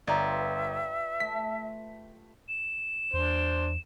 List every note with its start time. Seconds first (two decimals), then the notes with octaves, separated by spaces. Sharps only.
0.07 G1 F4 G4 B4 D5 E5 A#5
1.20 A3 B6
2.49 E7
3.13 E2 D4 C5